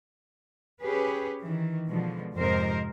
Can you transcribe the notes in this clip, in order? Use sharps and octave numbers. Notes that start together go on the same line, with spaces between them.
C#4 G4 G#4 B4
D#3 E3
B2 D3 F3 G#3
F2 G#2 C3 A#4 C5 D#5